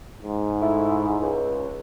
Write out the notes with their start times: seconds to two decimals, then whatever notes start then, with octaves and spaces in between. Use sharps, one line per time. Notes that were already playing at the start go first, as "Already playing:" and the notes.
0.23 G#2
0.62 A3 E4
1.21 C#2